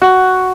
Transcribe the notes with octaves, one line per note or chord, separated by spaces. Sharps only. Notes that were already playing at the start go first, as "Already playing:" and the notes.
F#4